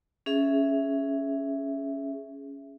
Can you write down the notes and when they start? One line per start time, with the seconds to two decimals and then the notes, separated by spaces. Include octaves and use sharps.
0.26 C#4 G#4 E5